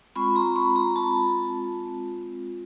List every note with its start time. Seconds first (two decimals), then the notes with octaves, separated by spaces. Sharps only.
0.16 G#3 C4 F4 B5 C#6
0.35 A#5 C6
0.56 B5 C#6
0.76 A#5 C6
0.96 A5 B5